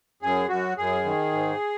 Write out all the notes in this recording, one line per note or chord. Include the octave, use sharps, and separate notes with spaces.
F#2 G#4
F#2 F#4
F#2 G#4
D#3
G#2